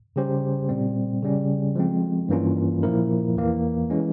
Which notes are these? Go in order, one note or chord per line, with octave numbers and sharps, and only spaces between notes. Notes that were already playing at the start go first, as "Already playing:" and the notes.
C#3 G3 C#4 G4 C5
A#2 G3 C4
C#3 G3 C#4
F3 G#3 C4
G2 E3 A#3 C#4 F4
A#2 F3 A#3 E4 A#4
E2 E3 A#3
E3 G#3 C#4